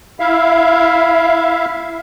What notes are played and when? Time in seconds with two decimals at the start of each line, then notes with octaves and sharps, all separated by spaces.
0.20 E4 E5 F5